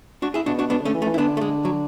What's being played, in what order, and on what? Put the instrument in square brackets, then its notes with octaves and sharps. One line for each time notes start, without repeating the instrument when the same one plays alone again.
[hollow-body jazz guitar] D4 F#4
E4 G#4
[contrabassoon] B2 [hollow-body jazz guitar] D4 F#4
[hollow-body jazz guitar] D4 F#4
[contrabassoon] B2 [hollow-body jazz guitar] B3 D4
[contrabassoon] D3 [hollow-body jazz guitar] A3 C#4
[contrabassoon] E3
[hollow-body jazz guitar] A3 C#4
[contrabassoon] E3
[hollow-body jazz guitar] E4
[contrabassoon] D3 [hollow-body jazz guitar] B3 D4
[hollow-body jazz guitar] A3
G#3
F#3